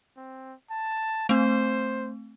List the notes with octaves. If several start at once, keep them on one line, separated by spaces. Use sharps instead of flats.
C4
A5
A3 C4 C5